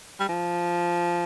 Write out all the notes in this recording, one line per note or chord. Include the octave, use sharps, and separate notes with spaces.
G3
F3